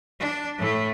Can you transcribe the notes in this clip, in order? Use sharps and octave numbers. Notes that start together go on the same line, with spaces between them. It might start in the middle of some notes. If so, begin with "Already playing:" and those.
D4
A2 A3